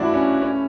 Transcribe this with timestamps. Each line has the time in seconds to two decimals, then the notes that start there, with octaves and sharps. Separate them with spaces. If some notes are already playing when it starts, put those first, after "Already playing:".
Already playing: G2 E3 A3 D4 E4 F#4
0.14 C#4
0.42 C#4